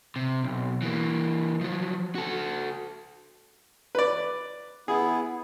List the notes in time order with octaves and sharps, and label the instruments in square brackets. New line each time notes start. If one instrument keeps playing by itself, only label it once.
[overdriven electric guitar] C3
B1
E3 A#3
F3 F#3
F#4 A4
[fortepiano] B4 D5
[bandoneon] B3 E4 [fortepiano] G#4